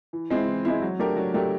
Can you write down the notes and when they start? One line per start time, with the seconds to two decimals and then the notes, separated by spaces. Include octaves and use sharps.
0.13 E3
0.30 G#3 C4 E4
0.48 E3
0.65 G#3 C4 E4
0.82 F#3
0.99 A3 D4 G4 A#4
1.17 F#3
1.34 A3 D4 G4 A#4